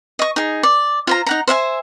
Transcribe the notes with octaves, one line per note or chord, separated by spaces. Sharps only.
D#5 C#6
D#4 G#4
D5
F4 C5 A#5
D#4 F#5 A#5
C5 E5 F5 G#5